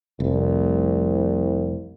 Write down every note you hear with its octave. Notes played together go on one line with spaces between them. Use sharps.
F1 C2